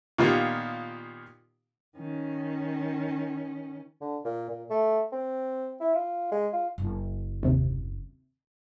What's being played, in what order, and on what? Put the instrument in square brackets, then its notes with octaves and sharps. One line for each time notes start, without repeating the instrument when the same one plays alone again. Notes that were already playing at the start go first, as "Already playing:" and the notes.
[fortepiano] A#2 D#3 A#3 B3 F4 G4
[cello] D#3 C#4
[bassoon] D3
A#2
A#2
A3
C4
E4
F4
G#3
F4
[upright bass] F#1
[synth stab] D#2 C3